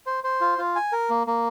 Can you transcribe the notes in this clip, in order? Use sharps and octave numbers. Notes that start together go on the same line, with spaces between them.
C5
C5
F4
F4
G#5
A#4
A#3
A#3